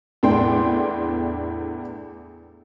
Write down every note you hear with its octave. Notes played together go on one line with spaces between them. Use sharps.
E2 A2 B3 D4 G5 C6